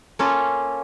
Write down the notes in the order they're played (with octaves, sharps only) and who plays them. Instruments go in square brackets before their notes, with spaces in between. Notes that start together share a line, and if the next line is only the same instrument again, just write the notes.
[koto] A#3 C#4 F4 A4